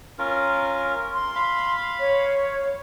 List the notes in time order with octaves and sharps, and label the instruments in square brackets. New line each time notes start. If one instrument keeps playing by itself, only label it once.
[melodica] C#4 F4 A#4
[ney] C6
[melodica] F5 B5
[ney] C#5